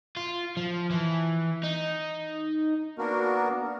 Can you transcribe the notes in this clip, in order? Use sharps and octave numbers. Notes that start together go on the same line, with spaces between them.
F4
F3
E3
D#4
A#3 B3 D4 F#4 A#4